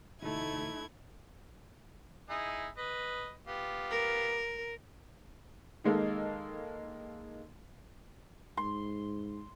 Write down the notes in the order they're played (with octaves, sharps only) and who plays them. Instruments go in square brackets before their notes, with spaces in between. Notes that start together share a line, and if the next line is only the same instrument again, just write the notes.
[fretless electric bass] E1 D2 [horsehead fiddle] A3 D#4 [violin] E4 G#6
[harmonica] D#4 E4 G#4
B4 D#5
B3 F4 G4
[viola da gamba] A#4
[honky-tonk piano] D#3 G#3 A#3 D#4 A4
[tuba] G#2 [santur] C6